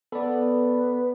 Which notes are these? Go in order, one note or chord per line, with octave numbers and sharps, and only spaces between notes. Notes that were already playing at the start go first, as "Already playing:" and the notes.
B3 A4 D5